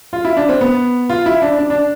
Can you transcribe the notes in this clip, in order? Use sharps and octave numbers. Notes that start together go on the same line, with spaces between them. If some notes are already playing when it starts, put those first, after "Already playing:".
F4
E4
D4
C4
B3
F4
E4
D4
D4
D4